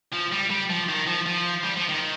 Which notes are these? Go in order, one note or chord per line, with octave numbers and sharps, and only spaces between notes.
F3
G3
G3
F3
D#3
F3
F3
G3
F3
D#3